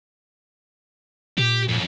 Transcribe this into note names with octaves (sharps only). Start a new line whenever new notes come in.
A#2 G4
F2 C#4